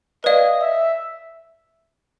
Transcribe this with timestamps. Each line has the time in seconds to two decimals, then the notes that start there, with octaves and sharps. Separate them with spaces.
0.24 B4 D5 D#5 F5
0.61 E5